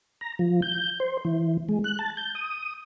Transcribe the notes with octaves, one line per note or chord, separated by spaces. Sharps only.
A#5
F3
G6
C5
E3
G#3
F#6
A5
G6
D#6